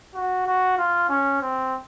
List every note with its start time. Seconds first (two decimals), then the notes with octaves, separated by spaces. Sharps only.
0.15 F#4
0.46 F#4
0.77 F4
1.09 C#4
1.42 C4